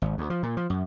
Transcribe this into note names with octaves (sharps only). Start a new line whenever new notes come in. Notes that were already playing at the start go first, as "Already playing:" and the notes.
G#1
D2
F3
A#2
F3
F#2